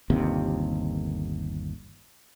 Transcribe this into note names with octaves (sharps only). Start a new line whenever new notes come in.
G1 D#2 C3